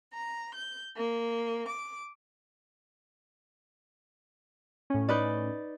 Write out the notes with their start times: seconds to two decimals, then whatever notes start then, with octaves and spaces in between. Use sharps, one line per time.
0.12 A#5
0.54 G6
0.96 A#3
1.68 D6
4.90 A2 C#4
5.08 D#4 B4 D5